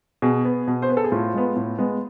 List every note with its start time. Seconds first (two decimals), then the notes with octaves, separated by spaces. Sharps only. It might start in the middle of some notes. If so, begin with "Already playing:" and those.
0.22 B2 G#4
0.45 B3
0.67 B2
0.82 C5
0.89 B3 B4
0.97 A4
1.04 G#4
1.12 A2 F4
1.34 G#3 B3
1.56 A2
1.78 G#3 B3